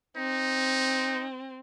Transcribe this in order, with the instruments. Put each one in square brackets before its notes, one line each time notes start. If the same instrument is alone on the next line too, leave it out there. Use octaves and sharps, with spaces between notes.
[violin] C4 [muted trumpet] D#4